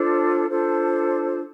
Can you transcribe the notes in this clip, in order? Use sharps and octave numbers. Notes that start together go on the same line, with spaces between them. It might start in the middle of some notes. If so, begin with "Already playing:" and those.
Already playing: D4 F4 A4 C5
D4 F4 A4 C5